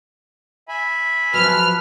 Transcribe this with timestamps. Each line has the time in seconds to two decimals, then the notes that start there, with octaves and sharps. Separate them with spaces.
0.68 E5 G#5 B5
1.34 F3 F#3 B4 F6